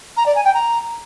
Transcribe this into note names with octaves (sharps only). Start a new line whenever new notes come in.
A#5
D5
G#5
G5
A#5